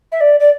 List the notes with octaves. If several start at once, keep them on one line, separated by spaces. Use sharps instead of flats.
E5
D5
D5